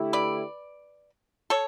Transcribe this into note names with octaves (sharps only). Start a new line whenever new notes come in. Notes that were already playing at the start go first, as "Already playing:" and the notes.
Already playing: D3 A3 E4 G4
B4 D5
A4 C#5